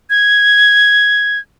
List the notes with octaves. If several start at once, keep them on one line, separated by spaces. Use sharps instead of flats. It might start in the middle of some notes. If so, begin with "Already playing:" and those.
G#6